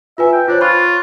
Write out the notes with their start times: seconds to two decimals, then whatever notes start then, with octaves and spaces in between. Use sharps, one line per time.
0.18 F4 B4 E5 G#5
0.32 G5
0.48 D4 F4 C5 C#5
0.61 F4 B5 C#6 F#6